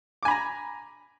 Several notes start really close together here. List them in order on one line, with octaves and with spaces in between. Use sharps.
D6 G#5 B5 A#5